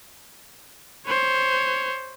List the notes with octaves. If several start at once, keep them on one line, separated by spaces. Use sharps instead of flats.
C5 C#5